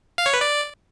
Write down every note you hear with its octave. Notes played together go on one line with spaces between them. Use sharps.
F5
C#5
B4
D5